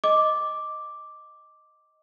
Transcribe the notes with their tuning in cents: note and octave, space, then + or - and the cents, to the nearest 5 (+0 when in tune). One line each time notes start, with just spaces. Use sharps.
D#5 +0 D6 +0